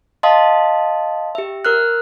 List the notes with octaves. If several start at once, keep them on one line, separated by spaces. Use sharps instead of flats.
D#5 F5 A5 C6 D#6
G4 E5
A#4 F6 F#6